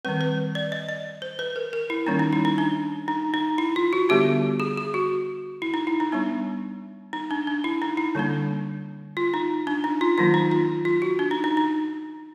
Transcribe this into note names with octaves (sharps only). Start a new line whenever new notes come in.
D#3 G3 C4 B4
B4
D5
D#5
D#5
C5
B4
A#4
A#4
E4
D#3 G3 A#3 C#4 D#4
D#4
E4
D#4
D4
D#4
D#4
E4
F4
F#4
D3 G3 B3 D4 G4
G#4
G#4
F#4
E4
D#4
E4
D#4
G3 B3 D4
D#4
D4
D4
E4
D#4
E4
D3 G3 A#3 D4
F4
D#4
D4
D#4
F4
D#3 F#3 A#3 F4
D#4
F4
F4
F#4
D4
D#4
D#4
D#4